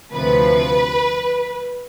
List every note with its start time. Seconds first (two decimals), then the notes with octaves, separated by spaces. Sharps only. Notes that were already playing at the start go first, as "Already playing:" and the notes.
0.12 D2 C3 F3 B4